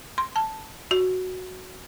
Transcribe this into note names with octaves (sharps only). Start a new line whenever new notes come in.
C6
A5
F#4